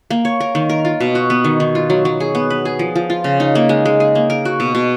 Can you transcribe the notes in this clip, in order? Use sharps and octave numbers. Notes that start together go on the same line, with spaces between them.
A#3
C#5
A#4
D#3
A#4
F4
B2
F#4
B3
D#3
D#3
F4
F#3
F#3
G#4
B3
B4
G#4
F3
F3
F4
C#3
D#4
A#3
G#3
G#3
G#4
A#3
A#4
F#4
B2
B2